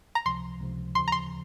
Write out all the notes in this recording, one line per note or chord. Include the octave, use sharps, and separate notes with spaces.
A#5
C#2 C3 F3 C6
C#2 C3 F3
D#2 C#3 F3 C6
A#5
C6